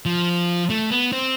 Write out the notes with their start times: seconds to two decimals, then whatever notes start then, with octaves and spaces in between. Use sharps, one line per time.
0.06 F3
0.70 A3
0.90 B3
1.12 C4